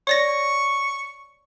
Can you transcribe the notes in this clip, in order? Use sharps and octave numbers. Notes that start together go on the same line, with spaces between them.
C#5 D5 C#6 A#6